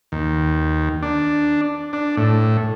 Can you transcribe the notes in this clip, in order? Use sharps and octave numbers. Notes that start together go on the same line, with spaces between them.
D#2
D4
D4
A2